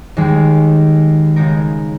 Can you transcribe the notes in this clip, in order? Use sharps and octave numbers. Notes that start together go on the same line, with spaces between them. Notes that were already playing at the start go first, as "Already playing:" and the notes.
D#2 D#3 G#3
C#3 G#3 D#4 A#4